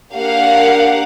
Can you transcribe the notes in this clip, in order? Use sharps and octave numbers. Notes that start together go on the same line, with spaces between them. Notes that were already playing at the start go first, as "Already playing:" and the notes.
A#3 D4 G4 F5 F#5